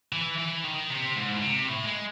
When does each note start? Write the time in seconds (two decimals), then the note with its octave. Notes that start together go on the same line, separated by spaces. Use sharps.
0.13 E3
0.38 E3
0.64 D#3
0.90 C3
1.16 G#2
1.33 A2
1.42 C3
1.68 A2
1.85 G#3